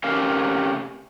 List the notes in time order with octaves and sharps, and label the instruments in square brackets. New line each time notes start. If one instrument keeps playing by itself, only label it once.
[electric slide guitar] C3 A3 C#4 G4 A#4 F5